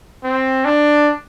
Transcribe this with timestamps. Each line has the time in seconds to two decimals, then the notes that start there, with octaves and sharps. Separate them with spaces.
0.24 C4
0.65 D4